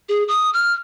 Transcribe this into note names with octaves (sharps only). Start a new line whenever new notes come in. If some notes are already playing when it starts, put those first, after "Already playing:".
G#4
D#6
F6